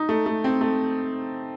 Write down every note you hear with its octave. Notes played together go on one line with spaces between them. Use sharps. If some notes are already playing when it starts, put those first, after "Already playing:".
Already playing: D#4
A3
A3
C4
A3